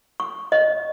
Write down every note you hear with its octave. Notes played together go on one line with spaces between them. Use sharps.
C#6
D#5